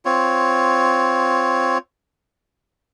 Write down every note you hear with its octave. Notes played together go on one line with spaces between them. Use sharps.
C4 F4 C#5